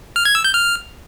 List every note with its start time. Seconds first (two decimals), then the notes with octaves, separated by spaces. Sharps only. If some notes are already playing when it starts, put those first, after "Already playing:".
0.16 F6
0.25 G#6
0.35 E6
0.44 G6
0.54 F6